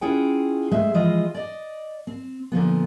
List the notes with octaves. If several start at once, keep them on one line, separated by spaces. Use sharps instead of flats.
C#4 E4 F4 G#4 F#5 G5
G#3 A3 G#4 C5 E5 F5
E3 F3 G#3 F4 D#5
D5 D#5
C4
A#2 D3 F3 B3